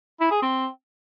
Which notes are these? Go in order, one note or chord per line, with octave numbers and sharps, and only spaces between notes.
E4
G#4
C4